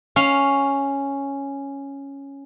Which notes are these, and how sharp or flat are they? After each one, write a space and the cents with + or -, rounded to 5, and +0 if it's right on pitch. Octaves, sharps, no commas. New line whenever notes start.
C#4 +0 F5 +0